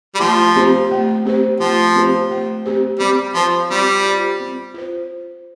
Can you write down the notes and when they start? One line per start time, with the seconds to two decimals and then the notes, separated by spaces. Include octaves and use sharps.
0.15 G3
0.20 F3 A3
0.56 C4 G4 C5
0.91 A3
1.25 C4 G4 C5
1.60 F3 A3
1.95 C4 G4 C5
2.31 A3
2.66 C4 G4 C5
3.00 G3 C4
3.35 F3 F4 C5
3.70 G3 C4
4.05 F4 C5
4.40 C4
4.74 F4 C5